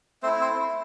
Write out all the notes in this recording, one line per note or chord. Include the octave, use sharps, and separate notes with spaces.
A3 C4 E4 C5
C4 C5